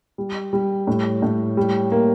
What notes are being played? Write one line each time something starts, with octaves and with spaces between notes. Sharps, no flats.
G3
G3
A2
A2
G3
A#3